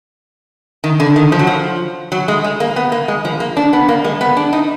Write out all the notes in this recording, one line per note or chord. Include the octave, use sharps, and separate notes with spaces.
D#3
D3
D#3
F3
F#3
F3
F#3
G#3
G#3
A#3
B3
A#3
G#3
F3
A#3
D4
B3
A#3
G#3
B3
D4
D#4